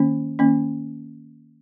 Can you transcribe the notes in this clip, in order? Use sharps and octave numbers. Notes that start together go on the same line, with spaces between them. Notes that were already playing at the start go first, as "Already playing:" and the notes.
Already playing: D#3 A#3 C#4
D#3 A#3 C#4